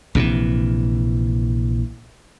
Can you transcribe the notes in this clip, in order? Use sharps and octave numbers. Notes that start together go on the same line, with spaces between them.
A#1 C3 D#3 E3